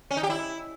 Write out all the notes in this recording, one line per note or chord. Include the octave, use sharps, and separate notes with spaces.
C#4
D#4
G4
E4